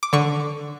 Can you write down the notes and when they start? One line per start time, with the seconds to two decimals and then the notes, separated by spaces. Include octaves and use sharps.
0.03 D6
0.13 D3 C#6